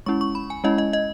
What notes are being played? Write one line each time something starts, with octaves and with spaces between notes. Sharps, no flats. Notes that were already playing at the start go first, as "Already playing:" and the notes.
G#3 C#4 E4 C#6
C#6
B5
G#5
G#3 C#4 E4 D#5
D#5
D#5